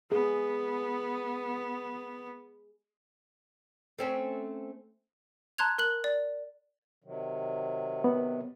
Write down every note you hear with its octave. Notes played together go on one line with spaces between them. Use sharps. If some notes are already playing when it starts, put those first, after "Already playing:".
B3 G#4
A3 C4 C#4
A5 A#5 C6 F#6 G#6 F7
A#4 F#6 F#7
D5
C3 D#3 F#3
B3